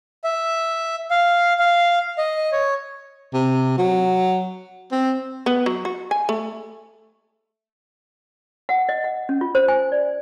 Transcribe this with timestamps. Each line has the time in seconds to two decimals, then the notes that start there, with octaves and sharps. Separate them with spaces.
0.24 E5
1.11 F5
1.59 F5
2.18 D#5
2.52 C#5
3.33 C3
3.78 F#3
4.91 C4
5.46 B3
5.66 F#3
5.85 F#4
6.11 G#5
6.29 A3
8.69 F#5
8.89 D#5
9.04 F#5
9.29 C#4
9.41 F4
9.55 C5
9.68 G#5
9.92 D5